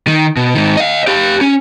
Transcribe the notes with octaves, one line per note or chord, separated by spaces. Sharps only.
D#3
B2
G#2 D#3
D#5 F5
G4 F5
C#4